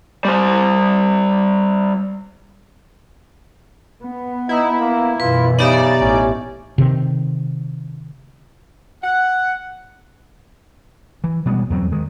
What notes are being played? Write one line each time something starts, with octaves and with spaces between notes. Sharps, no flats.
G3 C5
B3
D#4 E4
A#3
F#2 B2 E3 F4 B4
C#3 B3 D#4 G4 D5 E5
A1 C#4
C3 D#3
F#5
E3
B2 G3 G#3 B3
E2 F#3 A#3 C4
D#3 G#3